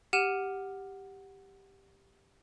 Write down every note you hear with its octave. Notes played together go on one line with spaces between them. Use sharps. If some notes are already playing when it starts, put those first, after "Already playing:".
G4 F#5 F6 D#7 E7